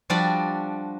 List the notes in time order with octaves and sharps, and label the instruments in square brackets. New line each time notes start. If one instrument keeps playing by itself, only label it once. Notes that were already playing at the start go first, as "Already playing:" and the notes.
[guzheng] F3 G3 D4 F#4 D5